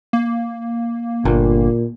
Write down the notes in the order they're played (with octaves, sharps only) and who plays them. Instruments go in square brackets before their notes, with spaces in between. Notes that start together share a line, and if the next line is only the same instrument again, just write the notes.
[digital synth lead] A#3
[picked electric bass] G1 [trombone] A#2